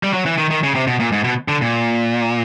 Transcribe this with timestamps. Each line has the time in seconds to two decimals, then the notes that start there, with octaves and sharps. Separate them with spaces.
0.03 G3
0.13 F#3
0.26 E3
0.38 D#3
0.50 D#3
0.63 C#3
0.75 C3
0.87 B2
1.00 A#2
1.12 G#2
1.24 B2
1.48 D3
1.61 A#2